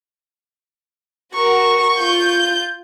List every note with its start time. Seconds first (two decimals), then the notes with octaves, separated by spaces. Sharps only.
1.33 F#4 A#4 C#6
1.98 F4 G6